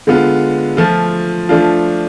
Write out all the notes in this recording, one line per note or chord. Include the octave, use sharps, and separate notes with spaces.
D3 G#3 B3 F4
F3 A3 F4
F3 A3 D4 F4